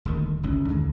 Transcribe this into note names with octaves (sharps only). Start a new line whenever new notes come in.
D#1 D2 D#3
G1 C#2 C#4
D#2 D3 G#3